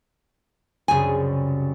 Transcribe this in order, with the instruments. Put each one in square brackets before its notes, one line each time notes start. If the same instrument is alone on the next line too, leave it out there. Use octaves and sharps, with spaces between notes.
[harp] C2 F#2 C#3 [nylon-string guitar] G#4 G#5